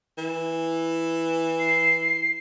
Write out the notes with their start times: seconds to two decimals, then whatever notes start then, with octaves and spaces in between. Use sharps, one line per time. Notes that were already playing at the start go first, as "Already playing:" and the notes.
0.18 E3
1.60 C7